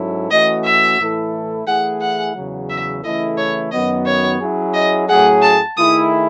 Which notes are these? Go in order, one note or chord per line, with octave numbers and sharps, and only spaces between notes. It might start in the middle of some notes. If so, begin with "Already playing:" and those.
Already playing: G#2 F#3 C#4 E4 A4
E3 A3 C#4 F#4 D#5
E5
A2 E3 A3 E4 A4
E3 A3 E4 G#4 F#5
F#5
E2 C#3 F#3
E5
C#3 E3 A3 E4 A4 D#5
C#5
F#2 D#3 F#3 B3 D#5
C#5
F#3 C#4 E4 G#4
D#5
A2 F#3 A3 C#4 G#4 F#5
A5
D#3 A3 E4 G#4 D#6